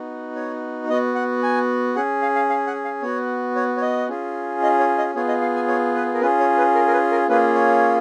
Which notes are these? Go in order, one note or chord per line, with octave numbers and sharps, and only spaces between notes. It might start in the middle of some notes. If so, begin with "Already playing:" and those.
Already playing: B3 D#4 F#4
C#5
B3 F#4 D#5
F#5
G#5
C#4 G#4 F#5
F5
F5
F5
F#5
F5
B3 F#4 C#5
C#5
C#5
D#5
C#4 F4 G#4
D#5
C#5
D#5
B3 F4 G#4 C#5
D#5
F5
G#5
C#5
B4
A#4
C#4 F4 G#4 B4
C#5
B4
A#4
A#4
B4
A#4
A#3 C#4 F4 G#4 B4
C#5